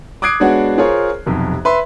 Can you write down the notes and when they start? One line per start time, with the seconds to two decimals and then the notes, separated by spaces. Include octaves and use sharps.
0.22 D6 D#6 F#6 G#6 C7 D7
0.40 G#3 B3 D4 F#4 C#5
0.78 F4 G#4 A#4 C5 C#5
1.26 B1 F2 C3
1.65 B4 E5 C6